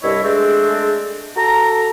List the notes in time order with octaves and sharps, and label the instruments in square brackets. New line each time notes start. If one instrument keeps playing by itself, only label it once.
[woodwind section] C2 G2 E4 C#5 D#5
G#3 A3 C4 D4 G#4
F#4 A4 A#5